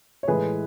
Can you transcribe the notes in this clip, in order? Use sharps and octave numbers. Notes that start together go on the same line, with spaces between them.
C#5
A2 E3 G#3 G#4 B4